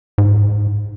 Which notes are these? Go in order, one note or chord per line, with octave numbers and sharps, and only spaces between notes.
G#2